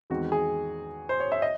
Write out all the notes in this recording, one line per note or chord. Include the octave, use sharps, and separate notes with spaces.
E2 D#3 G#3 C4 F#4
G#4
C5
C#5
E5
D#5